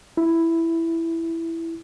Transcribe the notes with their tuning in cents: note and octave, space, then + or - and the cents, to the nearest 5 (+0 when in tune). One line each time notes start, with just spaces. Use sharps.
E4 +5